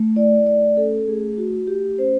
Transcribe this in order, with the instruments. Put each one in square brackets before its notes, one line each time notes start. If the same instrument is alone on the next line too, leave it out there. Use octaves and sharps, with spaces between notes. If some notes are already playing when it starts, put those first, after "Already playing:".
Already playing: [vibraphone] A3
E4 D5
A3 D5
C#4 A4
A3 G#4
E4 F#4
A3 G4
C#4 C5